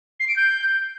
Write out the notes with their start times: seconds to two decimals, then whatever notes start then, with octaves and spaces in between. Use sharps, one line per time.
0.20 C7
0.28 D7
0.36 G6